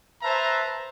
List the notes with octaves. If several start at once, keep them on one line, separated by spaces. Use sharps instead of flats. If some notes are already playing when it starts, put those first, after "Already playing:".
B4 C5 E5 A5 A#5